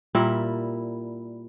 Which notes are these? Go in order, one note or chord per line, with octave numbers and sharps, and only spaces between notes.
A#2 G3 E4 A#4